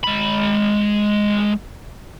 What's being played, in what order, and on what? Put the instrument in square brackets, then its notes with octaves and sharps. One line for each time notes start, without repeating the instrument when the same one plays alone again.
[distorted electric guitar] G#3 B5